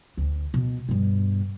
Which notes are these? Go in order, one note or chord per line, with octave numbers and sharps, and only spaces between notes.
D2
B2
G2 B2